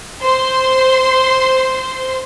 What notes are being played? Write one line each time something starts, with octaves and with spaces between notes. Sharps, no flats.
C5 C6